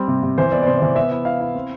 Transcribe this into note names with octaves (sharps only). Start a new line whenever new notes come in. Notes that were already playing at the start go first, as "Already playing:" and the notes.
Already playing: G3 C4
C3
C3
E3 C5
B3 D5
D5
C3 C5
E3 D5
B3 E5
E4
E4 F5
E4
C4